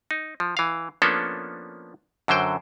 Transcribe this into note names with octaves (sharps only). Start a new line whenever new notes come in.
D#4
F3
E3 F5
F3 A#3 B3 C#4 D4 A4
F#2 D3 F#3 C5 G5